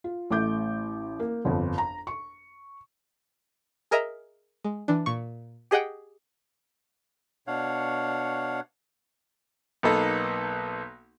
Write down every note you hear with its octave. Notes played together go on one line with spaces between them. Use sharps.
F4
A1 A3 D6 G6
A#3
G1 F2
A#5
C#6
G#4 A#4 D#5 E5 A#5
G#3
E3 D4
A#2 C#6
G4 G#4 D#5 F#5 G5
B2 D4 C#5 F5 F#5
B1 A#3 B3 D#4 A4 B4